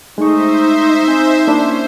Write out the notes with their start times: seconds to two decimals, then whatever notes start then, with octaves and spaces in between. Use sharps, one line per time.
0.18 G#3 A3 D#4 C5 E5 C#6
1.08 C4 G#5
1.47 A#3 C#4 D4 E4 C5